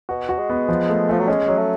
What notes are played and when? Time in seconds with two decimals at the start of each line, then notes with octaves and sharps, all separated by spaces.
0.09 B2 F#4
0.29 F#4
0.38 G#3
0.50 B3
0.69 F3
0.89 A3
1.09 F3 A3
1.19 F#3
1.28 G#3 C#4
1.48 F#3
1.58 A3